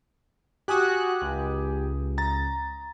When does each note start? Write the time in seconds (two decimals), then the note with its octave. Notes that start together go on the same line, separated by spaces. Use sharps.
0.68 F#4 G4 G#5 D#6 F#6
1.21 C#2
2.18 A#5 A6